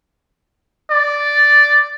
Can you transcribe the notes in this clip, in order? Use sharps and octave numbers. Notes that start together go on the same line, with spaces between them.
D5